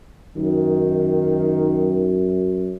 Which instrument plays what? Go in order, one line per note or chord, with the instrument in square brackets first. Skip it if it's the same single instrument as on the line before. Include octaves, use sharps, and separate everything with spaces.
[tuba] F#2 [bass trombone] D#3